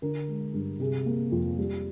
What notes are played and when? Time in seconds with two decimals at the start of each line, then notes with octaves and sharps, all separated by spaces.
0.02 D3 A#4
0.28 G#3
0.54 G2
0.79 C3 G#4
1.06 A#3
1.32 F2
1.58 G3